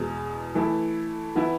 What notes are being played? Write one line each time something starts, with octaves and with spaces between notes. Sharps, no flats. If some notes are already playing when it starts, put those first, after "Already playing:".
Already playing: E2 B2 G#3
E3 A3 E4 A4
E3 B3 E4